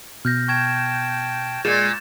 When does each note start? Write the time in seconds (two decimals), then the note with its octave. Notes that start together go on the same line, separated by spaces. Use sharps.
0.25 B2 F6 G6 A#6
0.48 G5 A5 C#6 G#6 E7
1.65 A#2 G#3 G6 A6 E7